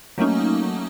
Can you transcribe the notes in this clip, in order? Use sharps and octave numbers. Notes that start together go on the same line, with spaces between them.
F#3 A3 A#3 C#4 D#4